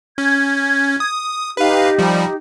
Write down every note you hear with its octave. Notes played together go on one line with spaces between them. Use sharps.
C#4 G#6
D#6
D#4 G4 B4 F5
F3 G3